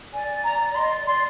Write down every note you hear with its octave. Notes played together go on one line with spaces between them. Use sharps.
D5 G#5
A#5
A#5
D#5 C6
D5
D5 C6